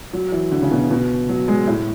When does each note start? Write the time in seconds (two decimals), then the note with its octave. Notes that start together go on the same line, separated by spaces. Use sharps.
0.13 F#3
0.32 E3
0.52 D3
0.62 C#3
0.71 B2
0.91 B2
1.29 F#3
1.48 G#3
1.67 A2